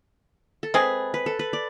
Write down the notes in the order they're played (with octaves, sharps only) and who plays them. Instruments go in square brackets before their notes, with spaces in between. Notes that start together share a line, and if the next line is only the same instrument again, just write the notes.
[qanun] A4
[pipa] G#3 C4 G#4 [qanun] B4
[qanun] B4
A4
B4
D5